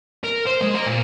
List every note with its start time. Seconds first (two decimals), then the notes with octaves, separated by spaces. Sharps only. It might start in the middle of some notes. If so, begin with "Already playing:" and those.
0.24 A#4
0.46 C5
0.61 G#3
0.74 A#4 F5
0.86 A#2